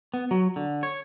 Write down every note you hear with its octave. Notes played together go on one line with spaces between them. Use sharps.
B3
F#3
D3
C#5